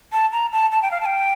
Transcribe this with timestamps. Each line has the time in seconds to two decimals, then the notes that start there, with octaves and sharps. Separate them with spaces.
0.12 A5
0.32 A#5
0.53 A5
0.72 A5
0.82 G5
0.91 F5
1.01 A5
1.06 G5